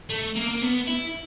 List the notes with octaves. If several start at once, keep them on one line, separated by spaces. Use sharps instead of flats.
A3
A#3
A#3
B3
E4